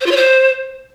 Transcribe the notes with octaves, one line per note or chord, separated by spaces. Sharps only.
C5
F4
C#5
C5